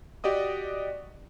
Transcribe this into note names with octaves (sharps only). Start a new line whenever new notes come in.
F#4 G4 D5 D#5 D#6